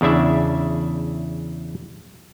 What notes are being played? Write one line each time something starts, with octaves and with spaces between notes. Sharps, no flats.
E2 C#3 D4 E4 E5